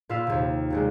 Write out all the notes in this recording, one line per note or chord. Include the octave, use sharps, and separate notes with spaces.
A#2 F4 B4 F5 E6 C7
D#2 C3
C2 C3 G#3